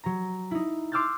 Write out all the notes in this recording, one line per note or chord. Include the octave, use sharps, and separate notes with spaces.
F#3 A#5
D#4 E4
C6 D6 E6 F6 G6 A6